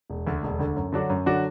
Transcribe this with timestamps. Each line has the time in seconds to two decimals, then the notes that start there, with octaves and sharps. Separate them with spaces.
0.10 E1
0.27 D2 D3
0.43 E1
0.59 D2 D3
0.76 F#2
0.92 D3 F#3 D4 F#4
1.10 F#2
1.26 D3 F#3 D4 F#4